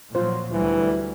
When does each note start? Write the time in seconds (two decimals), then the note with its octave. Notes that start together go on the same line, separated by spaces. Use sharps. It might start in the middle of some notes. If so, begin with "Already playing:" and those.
0.15 A#2 F3 F#3 F4 C5
0.52 D2 E3 F#3 G3